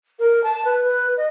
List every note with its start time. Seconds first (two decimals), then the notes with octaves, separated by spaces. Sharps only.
0.19 A#4
0.44 A5
0.65 B4
0.84 B4
1.17 D#5